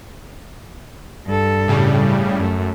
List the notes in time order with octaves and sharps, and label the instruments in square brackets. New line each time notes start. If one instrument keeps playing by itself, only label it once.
[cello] G2 A4
[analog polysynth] A2 C#3 G3
[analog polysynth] F#2 [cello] A3